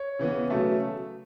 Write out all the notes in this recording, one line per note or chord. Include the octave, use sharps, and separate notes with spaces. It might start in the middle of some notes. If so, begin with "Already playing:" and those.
Already playing: C#5
C#3 E3 B3
C#3 F#3 A3 E5